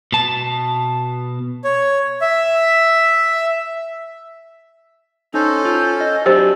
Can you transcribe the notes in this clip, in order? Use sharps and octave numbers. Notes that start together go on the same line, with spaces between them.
B2 A5
C#5
E5
C#4 D#4 A4 C5
F4
D#5
F#3 D4 G4 C5